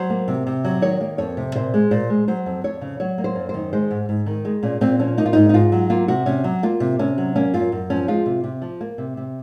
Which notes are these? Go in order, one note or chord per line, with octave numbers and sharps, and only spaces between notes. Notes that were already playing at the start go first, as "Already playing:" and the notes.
Already playing: F#3 C5
A#3
C3
C3
F#3
D#3 C#5
A#3
F2 C#5
C3
A#2 C5
G#3
A#2 C5
G#3
F#3 C5
F2
F2 C#5
C#3
F#3 C#5
A#3
C5
F#2
D#3 C5
G#3 C5
G#2
G#2
D#3
G#3
A#2 C#4
A#2 C4
F3 C#4
A#3 D#4
F4
G#2 D#4
D#4
G#2 F4
F#3
A#3 F4
C3 F#4
C3 C#4
F#3
A#3 F4
C3
C3 C#4
F#3
A#3 C#4
F#2 F4
F#2
F3 C#4
G#3 F4
C3
C3
F3
A#3
C3
C3